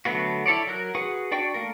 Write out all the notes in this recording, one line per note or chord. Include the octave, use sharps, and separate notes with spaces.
D3 F#3 A3 B3 F#4
E4 A4 C#5 D5
F#3 A#4 F#6
F#4 G#4 B4 F#5 C#6
D4 F#4 D5 G5 C#6
A3 A#3 A#4